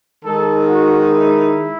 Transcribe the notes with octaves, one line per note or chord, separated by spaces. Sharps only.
D#3 G#3 D#4 A4
F#4
E4